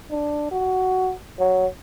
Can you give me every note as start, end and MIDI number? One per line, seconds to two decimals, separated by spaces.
0.11 0.51 62
0.52 1.12 66
1.39 1.66 54